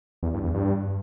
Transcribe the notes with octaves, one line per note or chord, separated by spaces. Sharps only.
E2
G2
E2
G2